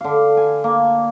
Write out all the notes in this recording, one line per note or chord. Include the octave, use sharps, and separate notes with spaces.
D3 F5
G#5
A#3